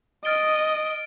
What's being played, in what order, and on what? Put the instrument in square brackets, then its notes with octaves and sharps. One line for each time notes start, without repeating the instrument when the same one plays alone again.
[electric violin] D#5 [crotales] F6 A6 D7 G7